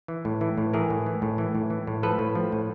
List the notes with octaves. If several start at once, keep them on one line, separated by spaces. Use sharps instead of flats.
E3
A2
E3
A2
E3 G#4 A#4
A2
E3
A2
E3
A2
E3
A2
F3 A4 B4
A2
F3
A2